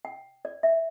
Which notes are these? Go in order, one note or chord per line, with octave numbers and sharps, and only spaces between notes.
G5
D5
E5